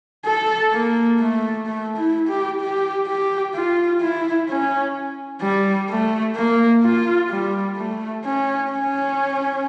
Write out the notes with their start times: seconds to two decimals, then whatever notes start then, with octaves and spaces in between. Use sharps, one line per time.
0.25 A4
0.72 A#3
1.19 A3
1.66 A3
1.97 E4
2.29 G4
2.61 G4
3.07 G4
3.55 F4
4.01 E4
4.49 C#4
5.42 G3
5.90 A3
6.36 A#3
6.83 F4
7.30 G3
7.77 A3
8.24 C#4
8.72 C#4